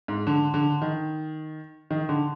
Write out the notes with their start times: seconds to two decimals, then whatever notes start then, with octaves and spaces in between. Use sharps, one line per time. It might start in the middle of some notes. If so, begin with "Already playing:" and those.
0.08 G#2
0.27 D3
0.54 D3
0.82 D#3
1.91 D#3
2.09 D3